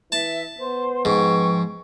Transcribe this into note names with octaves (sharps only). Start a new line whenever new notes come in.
E3 E5 A5
B3 C5
G#2 F3 G5 C#6